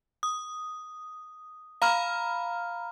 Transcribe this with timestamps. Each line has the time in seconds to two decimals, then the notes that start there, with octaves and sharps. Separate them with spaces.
0.23 D#6
1.82 F5 A#5 B5 F6